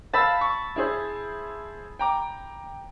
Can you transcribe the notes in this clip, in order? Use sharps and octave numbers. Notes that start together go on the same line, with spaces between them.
C5 F5 A5 B5 E6
C#6
E4 G#4 C5
G5 A#5 D6